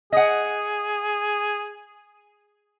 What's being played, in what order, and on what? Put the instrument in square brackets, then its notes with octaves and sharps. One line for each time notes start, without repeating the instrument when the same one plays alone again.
[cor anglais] G#4 [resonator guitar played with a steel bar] D#5 F#5